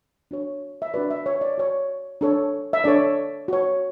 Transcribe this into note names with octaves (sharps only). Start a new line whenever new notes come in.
D4 F#4 C#5
E5
D4 F#4 B4 D5
E5
C#5
D5
F#4 C#5
D4 A4 C#5
E5
D4 A4 C#5 D5
F#4 C#5